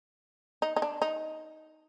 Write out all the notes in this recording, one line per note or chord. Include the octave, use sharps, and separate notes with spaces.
D#4
D#4
D4
D#4